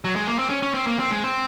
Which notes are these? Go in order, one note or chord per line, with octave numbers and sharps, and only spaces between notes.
F#3
G#3
A#3
C4
C#4
C#4
C4
A#3
C4
G#3
C4